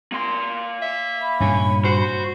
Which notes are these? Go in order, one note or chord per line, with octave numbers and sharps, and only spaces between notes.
A#3 C6
E5
B5
G2 A#2 C#3 C#4
F#4 C5